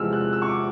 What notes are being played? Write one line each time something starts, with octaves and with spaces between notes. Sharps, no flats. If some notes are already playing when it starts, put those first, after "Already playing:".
Already playing: E2 C3 F3 G#3 E6 F6
F#6
E6
C#6
D6